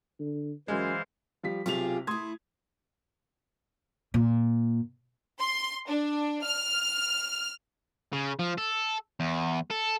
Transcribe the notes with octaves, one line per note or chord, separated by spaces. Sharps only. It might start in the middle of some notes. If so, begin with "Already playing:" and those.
D3
F#2 E3 G#3 C5 F5
F3 G3 B6
B1 C3 F4 G4 G#4 F7
A3 E4 C6 D#6 G#6
A#2
C6
D4
F6
C#3
F3
A4
E2
A4